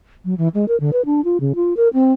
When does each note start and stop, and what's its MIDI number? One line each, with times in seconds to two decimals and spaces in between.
0.25 0.34 54
0.38 0.48 52
0.54 0.65 56
0.68 0.79 70
0.80 0.91 50
0.93 1.05 71
1.05 1.23 62
1.24 1.38 65
1.40 1.53 49
1.55 1.74 65
1.77 1.88 70
1.94 2.13 60